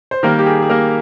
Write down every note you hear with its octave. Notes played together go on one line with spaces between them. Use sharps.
C5
D#3 G3 A#3 A#4
G4
G#4
G#4
A#3 A#4